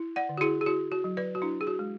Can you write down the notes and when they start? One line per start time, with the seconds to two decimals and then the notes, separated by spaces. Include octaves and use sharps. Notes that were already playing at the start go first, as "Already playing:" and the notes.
Already playing: E4
0.16 D5 F#5
0.29 D3
0.38 F#4
0.41 E4 G#4
0.61 G#4
0.66 E4 F#4
0.92 F#4
1.04 F#3
1.17 B4 D5
1.35 F#4
1.42 D4 E4
1.61 G#4
1.67 F#4
1.79 G#3